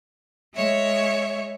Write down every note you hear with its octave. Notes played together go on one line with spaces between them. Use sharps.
G#3 C#5 E5